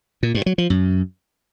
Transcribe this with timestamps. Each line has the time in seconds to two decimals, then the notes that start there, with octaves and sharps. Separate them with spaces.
0.23 A#2
0.35 G2
0.46 F#3
0.58 F3
0.70 F#2